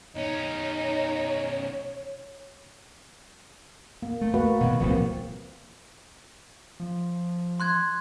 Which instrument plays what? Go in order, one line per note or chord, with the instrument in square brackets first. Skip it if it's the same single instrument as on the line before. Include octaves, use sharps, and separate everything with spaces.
[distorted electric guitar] B1 C#4 [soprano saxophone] D#4 [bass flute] C#5
[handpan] A#3
[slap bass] A3
[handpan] A#3 F#4 B4
[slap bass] B2 D#3 F#3
[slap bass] D1 C2 [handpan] F3 A#3 C4
[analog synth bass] F3
[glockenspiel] C6 F#6 G#6